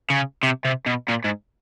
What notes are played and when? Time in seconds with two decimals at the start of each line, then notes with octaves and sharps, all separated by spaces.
0.10 C#3
0.43 C3
0.65 C3
0.86 B2
1.09 A#2
1.25 G#2